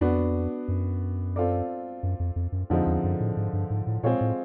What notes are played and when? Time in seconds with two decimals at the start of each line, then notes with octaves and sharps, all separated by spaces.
0.01 F2 B3 D4 F#4
0.68 F#2
1.36 C4 F4 A4 D5
2.03 F#2
2.20 F2
2.36 F2
2.52 F#2
2.70 F2 D3 F3 G#3 C4 D#4
2.87 E2
3.04 F#2
3.20 A2
3.37 G#2
3.53 G2
3.70 G#2
3.87 A2
4.03 A#2 G#3 C4 F4 G#4 C#5
4.21 A2